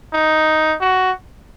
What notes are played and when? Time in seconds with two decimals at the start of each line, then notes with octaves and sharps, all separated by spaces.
0.13 D#4
0.81 F#4